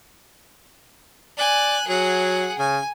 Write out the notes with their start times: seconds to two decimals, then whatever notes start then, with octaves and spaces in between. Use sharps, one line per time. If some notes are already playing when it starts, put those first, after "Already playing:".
1.38 D5 G#5 F#6
1.87 F#3 G#4 F#5
2.59 C#3 G#5